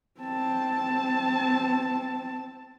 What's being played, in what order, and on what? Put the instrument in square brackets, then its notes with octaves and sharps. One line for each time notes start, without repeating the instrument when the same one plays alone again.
[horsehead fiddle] C4 A5